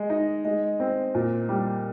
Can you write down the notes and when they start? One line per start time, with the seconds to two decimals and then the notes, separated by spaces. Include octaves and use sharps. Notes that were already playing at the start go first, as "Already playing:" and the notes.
Already playing: G#3
0.10 D#4
0.45 G#3
0.80 C4
1.14 A#2
1.49 G3